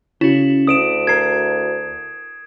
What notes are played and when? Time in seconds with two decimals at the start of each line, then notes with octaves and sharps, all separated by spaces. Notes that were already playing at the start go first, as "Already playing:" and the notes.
0.21 C#3 E4 F#4
0.67 D2 D#6 D7 E7
1.07 A4 A#4 G#6 C7